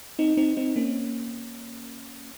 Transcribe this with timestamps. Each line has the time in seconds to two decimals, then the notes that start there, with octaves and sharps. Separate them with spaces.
0.19 C4 D#4
0.37 C4 D#4
0.57 C4 D#4
0.76 A#3 C#4